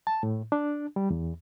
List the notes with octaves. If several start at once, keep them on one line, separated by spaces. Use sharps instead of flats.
A5
A2
D4
G3
E2